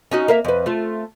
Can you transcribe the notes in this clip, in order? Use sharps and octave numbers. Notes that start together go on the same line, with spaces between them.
C#4 D#4 F#4
A#3 A#4 E5
F2 B4
A3 F4